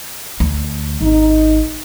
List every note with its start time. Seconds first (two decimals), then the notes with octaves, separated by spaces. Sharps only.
0.40 D2
1.01 G#1 D#4